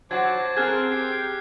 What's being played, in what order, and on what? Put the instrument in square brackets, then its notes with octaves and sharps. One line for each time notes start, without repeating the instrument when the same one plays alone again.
[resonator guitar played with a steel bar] F#3 F#4 [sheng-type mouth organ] C5 A5 [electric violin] D6 [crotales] G#6
[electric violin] C4 A#4 [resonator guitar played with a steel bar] G#4 [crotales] F6 F#6 G#6
[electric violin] G4 [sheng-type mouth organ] G5 [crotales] C7